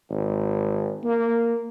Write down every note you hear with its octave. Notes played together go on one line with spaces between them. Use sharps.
G#1
A#3